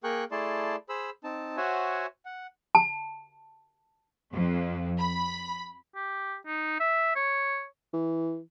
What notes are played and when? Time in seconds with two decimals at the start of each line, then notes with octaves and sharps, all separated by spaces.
0.04 A#3 G#4 A#4 G5 C#6 F#6
0.31 A3 E4 G#4 D5 A5 C6
0.89 G#4 C5 B5 E6
1.24 C4 D#4 A5
1.57 F#4 C5 C#5 E5 F#5 G#5
2.25 F#5
2.75 A5
4.32 F2
4.99 B5
5.95 G4
6.47 D#4
6.80 E5
7.15 C#5
7.94 E3